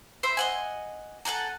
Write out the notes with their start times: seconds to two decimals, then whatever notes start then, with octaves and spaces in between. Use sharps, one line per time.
0.23 C5 E5 B5
0.37 D#5 F#5 G#5
1.25 A4 F#5 G#5 A#5